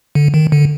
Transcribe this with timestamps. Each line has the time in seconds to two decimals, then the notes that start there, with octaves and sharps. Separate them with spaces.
0.15 D3
0.34 D#3
0.52 D3